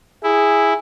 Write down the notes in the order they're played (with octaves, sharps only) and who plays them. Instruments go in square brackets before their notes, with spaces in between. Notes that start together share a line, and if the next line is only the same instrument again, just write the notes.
[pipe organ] E4 [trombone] G#4